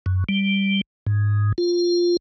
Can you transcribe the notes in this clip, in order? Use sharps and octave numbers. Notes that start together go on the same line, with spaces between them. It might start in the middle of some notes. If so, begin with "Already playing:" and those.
F#2
G3
G#2
F4